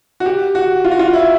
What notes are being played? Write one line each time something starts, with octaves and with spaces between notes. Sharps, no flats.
F#4
G4
F#4
F4
F#4
F4
E4